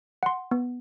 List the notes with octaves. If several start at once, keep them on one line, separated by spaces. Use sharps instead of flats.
F#5 C6
B3